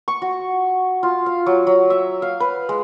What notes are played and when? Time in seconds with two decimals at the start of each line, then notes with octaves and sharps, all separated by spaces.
0.08 C#6
0.22 F#4
1.03 F4
1.26 F5
1.46 F#3
1.67 F#3
1.90 E5
2.22 F5
2.40 B4
2.69 G#3